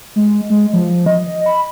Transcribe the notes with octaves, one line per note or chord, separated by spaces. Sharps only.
G#3
G#3
F3
D#5
B5